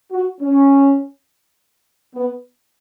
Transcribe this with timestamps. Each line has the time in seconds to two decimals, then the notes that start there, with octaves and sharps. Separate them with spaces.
0.12 F#4
0.41 C#4
2.15 B3